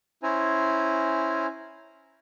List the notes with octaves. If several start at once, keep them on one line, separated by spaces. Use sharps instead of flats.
C#4 E4 C5 G#5 A#5